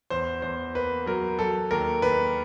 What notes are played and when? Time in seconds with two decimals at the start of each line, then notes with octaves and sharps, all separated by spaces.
0.10 E2 C5
0.42 E2 C5
0.75 A#3 B4
1.06 F#3 A#4
1.39 F#3 A4
1.71 D#2 A#4
2.02 D#2 B4